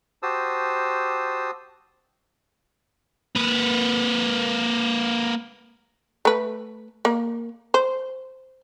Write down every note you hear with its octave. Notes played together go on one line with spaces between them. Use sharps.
F#4 G4 C5 A5 D#6 E6
A#3 B4
A3 B4
A#3
C5